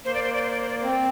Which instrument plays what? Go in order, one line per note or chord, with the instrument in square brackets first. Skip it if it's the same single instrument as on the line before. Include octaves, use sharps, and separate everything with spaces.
[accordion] A#3 [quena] C5
[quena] D5
C5
D5
C5
D5
C5
D5
C5
[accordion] C4
[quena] D5